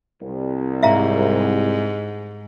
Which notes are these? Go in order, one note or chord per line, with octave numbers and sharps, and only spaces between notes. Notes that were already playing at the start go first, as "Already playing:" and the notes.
C2
G#2 E5 F5 A#5